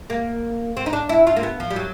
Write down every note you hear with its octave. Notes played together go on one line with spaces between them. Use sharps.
A#3
C4
D#4
D4
E4
F4
A#3
B3
F3
G3
F#3